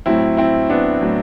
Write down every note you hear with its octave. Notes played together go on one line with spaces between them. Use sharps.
A2 F#3 C4 E4
C4 E4
B3 D4
A2 F#3